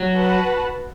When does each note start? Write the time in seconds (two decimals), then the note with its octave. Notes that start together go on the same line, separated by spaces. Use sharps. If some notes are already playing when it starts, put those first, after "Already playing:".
Already playing: F#3
0.13 F#4 B4 F#5 A5